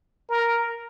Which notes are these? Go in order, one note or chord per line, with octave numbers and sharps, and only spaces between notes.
A#4